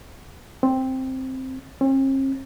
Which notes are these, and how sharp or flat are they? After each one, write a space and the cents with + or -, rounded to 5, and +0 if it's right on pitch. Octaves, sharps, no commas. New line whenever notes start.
C4 +0
C4 +45